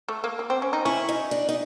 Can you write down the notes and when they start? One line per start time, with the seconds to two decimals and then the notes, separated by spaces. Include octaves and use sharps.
0.08 A3
0.24 A#3
0.39 A#3
0.50 C4
0.62 C#4
0.73 D#4
0.85 C#4 E4
1.09 D#4
1.31 D4
1.49 D#4